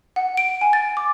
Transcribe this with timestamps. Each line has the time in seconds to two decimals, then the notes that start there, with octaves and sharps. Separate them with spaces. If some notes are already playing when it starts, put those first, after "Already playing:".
0.16 F#5
0.37 D7
0.61 G#5
0.73 A6
0.97 D6